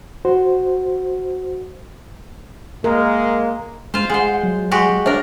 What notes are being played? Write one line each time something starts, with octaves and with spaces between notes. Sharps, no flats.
F#4 C5
G#3 A#3 A#4
G#3 F4 C5
G#3 C5 F#5
F#3
G#3 F#4 G4
D4 A#4 C5 C#5 E5